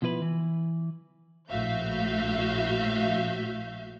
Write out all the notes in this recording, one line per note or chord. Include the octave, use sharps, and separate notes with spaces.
B2 F3 E4 B4 B5
E3
A#1 A2 F#4 E5 F5 G6